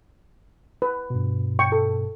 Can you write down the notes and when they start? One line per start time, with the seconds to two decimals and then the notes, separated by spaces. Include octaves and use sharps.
0.82 B4
1.10 G2 B2
1.59 G5 C#6
1.72 A4